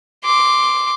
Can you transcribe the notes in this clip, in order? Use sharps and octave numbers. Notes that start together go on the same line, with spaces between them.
C6 D6